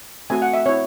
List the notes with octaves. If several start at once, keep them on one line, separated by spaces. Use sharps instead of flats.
A3 C4 F#4 G#5
F#5
E5
C4 E4 C#5